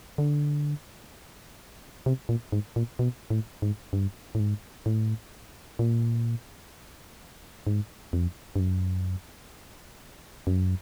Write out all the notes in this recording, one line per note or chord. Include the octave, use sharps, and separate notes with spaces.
D3
C3
A#2
G#2
A#2
B2
A2
G#2
G2
A2
G#2
A2
A#2
G#2
F2
G2
F#2
F#2